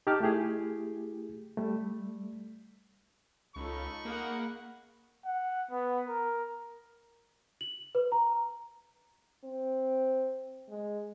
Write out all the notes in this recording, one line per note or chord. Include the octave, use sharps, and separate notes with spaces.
D#4 G4 A5 D6 F6
A3 E4 G4 G#4
G3 A3
C#2 C#4 D#4 F4 A4 B5 C#6
A#3 G#4 A#4 F#5
F#5
B3
A#4
F#7
B4
A#5
C4
G#3